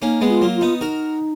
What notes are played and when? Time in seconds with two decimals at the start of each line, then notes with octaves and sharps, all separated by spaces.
0.02 A#3 C#4 D#4
0.21 G#3 B3
0.28 F4
0.41 F#3 A#3
0.55 F4
0.61 B3 D#4
0.80 D#4 F#4 A#4